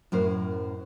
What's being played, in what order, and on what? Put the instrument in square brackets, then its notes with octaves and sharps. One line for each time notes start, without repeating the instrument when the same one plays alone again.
[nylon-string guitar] F#2 A2 A#4 C5